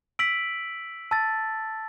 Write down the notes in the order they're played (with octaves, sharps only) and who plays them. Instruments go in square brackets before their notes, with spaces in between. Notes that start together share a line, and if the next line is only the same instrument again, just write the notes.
[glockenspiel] E6 B6 D7 F#7
A5 E6 A6